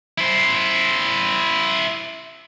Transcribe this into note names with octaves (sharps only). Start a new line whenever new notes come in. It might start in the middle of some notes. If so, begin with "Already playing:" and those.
E4 C5